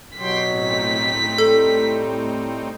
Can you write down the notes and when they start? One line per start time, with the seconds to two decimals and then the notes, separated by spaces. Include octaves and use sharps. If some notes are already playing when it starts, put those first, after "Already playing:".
0.18 B2 F#3 G4 G5 C6 B6
0.48 A2 C4 D#4
1.38 G3 A4